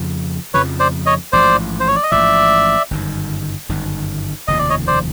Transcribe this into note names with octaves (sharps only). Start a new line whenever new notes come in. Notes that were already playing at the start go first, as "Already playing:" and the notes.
Already playing: F2 C#3 F3
F2 C#3 F3 B4 C#5
C5 D5
C#5 D#5
A1 G#2 F3 C5 D5
C5
C#5
D5
D#5
A1 G#2 F3 D5 E5
G1 F#2 D#3
G1 F#2 D#3
F1 D#2 C#3 F3 D#5
D5
C#5 D#5
C5 D5